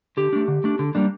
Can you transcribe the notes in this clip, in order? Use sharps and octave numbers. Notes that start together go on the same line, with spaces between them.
D3 G4
A3 D4
D3
A3 D4
D3
G3 A#3 D4